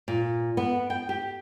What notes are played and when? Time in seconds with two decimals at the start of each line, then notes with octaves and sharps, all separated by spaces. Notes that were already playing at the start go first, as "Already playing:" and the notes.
0.08 A#2
0.57 B3
0.90 G5
1.09 G4